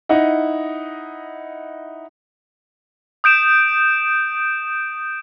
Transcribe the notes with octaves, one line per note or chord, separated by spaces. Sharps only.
D#4 E4 D#5 F#5
D#6 G6 D7 E7